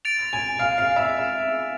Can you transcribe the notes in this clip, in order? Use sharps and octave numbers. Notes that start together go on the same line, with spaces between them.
A6 D7 F7
G#5
F5
F5
E5